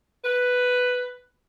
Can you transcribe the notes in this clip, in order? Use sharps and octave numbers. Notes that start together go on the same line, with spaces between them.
B4